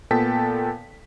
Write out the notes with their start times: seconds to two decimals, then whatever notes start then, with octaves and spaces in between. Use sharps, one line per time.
0.11 A#2 B3 A4 G5 A5 B6